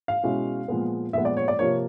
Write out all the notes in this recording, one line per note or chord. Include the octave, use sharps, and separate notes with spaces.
F5
B2 G#3 C#4 E4
A#2 F3 G#3 B3
A#2 F3 G#3 B3 E5
D5
C#5
D5
C3 F3 A#3 C#5